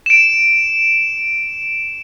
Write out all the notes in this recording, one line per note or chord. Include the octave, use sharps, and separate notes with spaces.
D7 E7